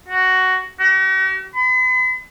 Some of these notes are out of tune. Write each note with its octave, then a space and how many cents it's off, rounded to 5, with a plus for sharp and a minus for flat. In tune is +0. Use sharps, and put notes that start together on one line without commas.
F#4 +10
F#4 +45
B5 +45